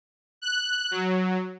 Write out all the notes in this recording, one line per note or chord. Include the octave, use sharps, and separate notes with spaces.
F#6
F#3